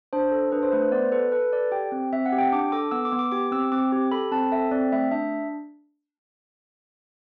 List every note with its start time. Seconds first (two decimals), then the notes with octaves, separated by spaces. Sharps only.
0.13 D4 C5
0.32 A4
0.52 D4 B4
0.63 C5
0.72 A3 B4
0.82 C5
0.92 B3 D5
1.12 A4 B4
1.32 A4 B4
1.53 A4 D5
1.72 G4 G5
1.92 C4
2.13 C4 E5
2.26 F#5
2.33 G4
2.38 G5
2.52 D4 D6
2.72 A4 D6
2.91 B3 E6
3.05 D6
3.13 B3
3.19 D6
3.32 G4 D6
3.51 C4 E6
3.72 C4 D6
3.92 G4
4.11 A4 B5
4.32 C4 A5
4.52 A4 E5
4.71 C4 D5
4.92 A3 E5
5.11 D4 E5